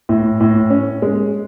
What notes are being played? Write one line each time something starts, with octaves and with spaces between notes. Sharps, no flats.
A2
A2
C#4
G#3